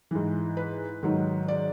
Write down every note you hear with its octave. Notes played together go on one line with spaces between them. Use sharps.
G#2 E3
B4
G#2 D#3 F#3
D5